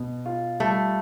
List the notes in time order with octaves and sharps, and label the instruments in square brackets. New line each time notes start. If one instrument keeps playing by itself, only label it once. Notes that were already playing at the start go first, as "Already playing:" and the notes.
Already playing: [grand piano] B2
F4
[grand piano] G3 [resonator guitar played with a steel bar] A3